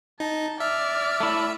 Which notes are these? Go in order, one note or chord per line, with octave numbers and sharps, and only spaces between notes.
D#4 A5
D5 E5 F6
A3 E4